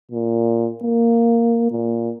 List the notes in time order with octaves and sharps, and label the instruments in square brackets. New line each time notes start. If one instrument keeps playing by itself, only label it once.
[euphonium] A#2
A#3
A#2